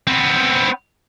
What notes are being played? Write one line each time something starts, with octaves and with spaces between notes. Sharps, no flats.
B3 C4